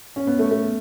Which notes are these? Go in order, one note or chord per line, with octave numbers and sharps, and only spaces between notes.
C#4
B3
A3
A3